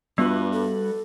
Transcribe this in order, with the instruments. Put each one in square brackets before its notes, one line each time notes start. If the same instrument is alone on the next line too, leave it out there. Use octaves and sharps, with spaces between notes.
[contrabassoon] G2 [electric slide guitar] G3 F#4 B4 [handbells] B3 [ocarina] F4
[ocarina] A4